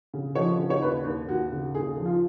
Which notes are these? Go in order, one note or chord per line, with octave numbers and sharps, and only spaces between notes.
C#3
F3 C#5
C#3
C#5
D#2 B4
D#2
D#2 F#4
C#3
D#2 G#4
F3
F4